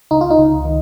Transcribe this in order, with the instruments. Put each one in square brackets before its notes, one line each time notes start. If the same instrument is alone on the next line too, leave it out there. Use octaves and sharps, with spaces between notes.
[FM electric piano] C#2 D#4
F4
D#4
C#2
D#3